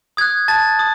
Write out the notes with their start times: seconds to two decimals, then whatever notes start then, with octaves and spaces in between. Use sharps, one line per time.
0.17 D#6 F#6 G#6
0.48 A5 A6
0.79 D#6